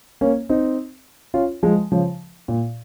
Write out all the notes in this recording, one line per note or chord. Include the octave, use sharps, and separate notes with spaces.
A#3 C#4
C4 D#4
C#4 F4
F3 G#3
C#3 F3
A#2